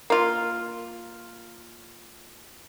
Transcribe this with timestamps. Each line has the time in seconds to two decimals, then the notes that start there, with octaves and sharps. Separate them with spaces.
0.10 A#3 F4